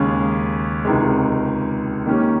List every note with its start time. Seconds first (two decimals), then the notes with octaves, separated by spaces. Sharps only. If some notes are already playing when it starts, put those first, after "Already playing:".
Already playing: D#2 C#3 G#3 C#4 G#4
0.85 C#2 C3 D#3 G#3
2.06 D#3 A#3 C#4 G4